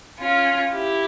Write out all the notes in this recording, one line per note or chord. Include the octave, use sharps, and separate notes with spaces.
C#4 F4
E4 G4